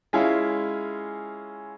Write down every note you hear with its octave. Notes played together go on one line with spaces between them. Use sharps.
G#3 C#4 E4 F4